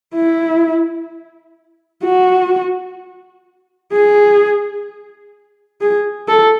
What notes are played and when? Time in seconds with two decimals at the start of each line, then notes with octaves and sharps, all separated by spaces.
0.15 E4
2.04 F#4
3.92 G#4
5.81 G#4
6.28 A4